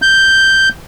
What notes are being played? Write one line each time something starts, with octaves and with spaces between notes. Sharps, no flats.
G6